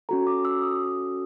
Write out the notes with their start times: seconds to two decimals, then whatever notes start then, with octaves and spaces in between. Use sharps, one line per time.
0.09 C#4 F#4 A4 A#5
0.27 D6
0.45 E6
0.62 D#6